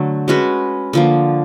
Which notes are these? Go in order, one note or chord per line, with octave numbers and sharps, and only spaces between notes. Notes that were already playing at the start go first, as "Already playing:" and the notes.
Already playing: D3 F#3 A3
G#3 C#4 F#4 B4
D3 F3 A#3